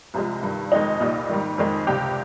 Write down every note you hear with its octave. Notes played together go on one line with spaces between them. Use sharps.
C2 C3 F3 G#3
G2 D#3 G3
F2 D#3 G#3 D#4
C2 A#2 G3
G#2 D#3 G3
F2 D#3 G#3
C#2 C3 G3 G4